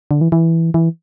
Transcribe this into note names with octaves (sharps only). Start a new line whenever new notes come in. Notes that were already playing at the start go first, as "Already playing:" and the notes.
D3
E3
E3
E3